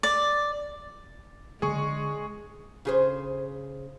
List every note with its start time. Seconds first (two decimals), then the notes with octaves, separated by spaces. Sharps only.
0.03 D5
1.62 D3 G#3 G#4 C#6
2.85 C#3 G#4 C5